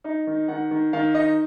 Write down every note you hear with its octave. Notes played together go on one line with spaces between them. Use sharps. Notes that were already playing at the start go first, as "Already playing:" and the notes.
D#4 D#5
D#3
D#3 F#5
D#3
D#3 F5
D#4 D#5